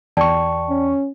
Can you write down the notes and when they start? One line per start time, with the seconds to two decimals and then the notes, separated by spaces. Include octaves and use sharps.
0.17 E2 D5 G5 A5 C#6
0.69 C#4